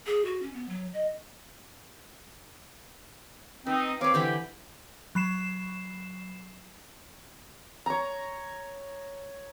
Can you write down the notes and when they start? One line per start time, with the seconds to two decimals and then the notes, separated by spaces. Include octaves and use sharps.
0.06 G#4
0.25 F#4
0.42 C#4
0.54 B3
0.69 F#3
0.94 D#5
3.67 C4 D#4 B4
4.01 C4 B4 C#5 F5 D6
4.14 D3 E3 G4 B5
5.15 F#3 B5 C7 E7
7.86 C#5 A#5